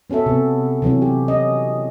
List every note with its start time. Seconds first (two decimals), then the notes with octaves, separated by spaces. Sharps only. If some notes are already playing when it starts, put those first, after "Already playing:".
0.10 B3 C#4 F#4 A4 E5
0.26 C3 B3
0.82 C3 E3 F#3 C#4
1.02 G4
1.28 C#4 D#5